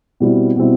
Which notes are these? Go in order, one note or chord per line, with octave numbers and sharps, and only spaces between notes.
B2 G3 C4 E4
B2 G3 C4 E4